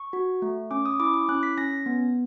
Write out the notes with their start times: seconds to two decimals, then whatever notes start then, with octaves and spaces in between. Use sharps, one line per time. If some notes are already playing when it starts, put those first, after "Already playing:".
Already playing: C#6
0.13 F#4
0.42 A3
0.71 C#4 D6
0.86 D#6
1.00 E4 D6
1.14 D6
1.29 C#4 F#6
1.43 B6
1.57 C#4 A#6
1.86 B3